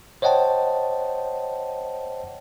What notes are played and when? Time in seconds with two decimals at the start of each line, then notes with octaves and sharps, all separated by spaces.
0.22 C5 C#5 D#5 F#5 G5 A5